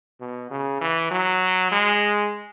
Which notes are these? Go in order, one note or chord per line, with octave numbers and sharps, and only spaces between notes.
B2
C#3
E3
F#3
G#3